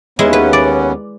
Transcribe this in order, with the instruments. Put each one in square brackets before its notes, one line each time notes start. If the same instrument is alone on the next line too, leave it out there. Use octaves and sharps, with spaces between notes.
[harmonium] D#2 B3 C#4 [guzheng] G#3 E4
[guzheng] B4
D5